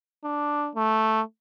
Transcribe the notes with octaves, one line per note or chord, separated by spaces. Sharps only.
D4
A3